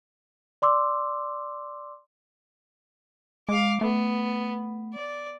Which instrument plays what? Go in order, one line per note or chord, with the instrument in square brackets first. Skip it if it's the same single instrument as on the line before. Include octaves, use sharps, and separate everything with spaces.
[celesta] D5 C6 D6 E6
[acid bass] G#3 [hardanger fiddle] F5 D6
[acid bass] A3 [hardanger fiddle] B3
[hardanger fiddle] D5